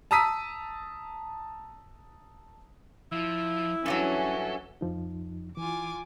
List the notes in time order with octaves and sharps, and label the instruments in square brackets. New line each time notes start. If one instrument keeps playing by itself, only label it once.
[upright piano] A5 A#5 D#6 E6 B6 D#7
[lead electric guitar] F3 [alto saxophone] E4
[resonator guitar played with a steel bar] G2 E3 F#3 [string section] C#4 [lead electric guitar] A4
[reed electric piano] F2 F3 D#4
[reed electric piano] E3 [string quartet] F4 G#5 D6